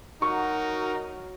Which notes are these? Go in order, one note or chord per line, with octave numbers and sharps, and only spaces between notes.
F#3 D#4 F#4 A#4 C#6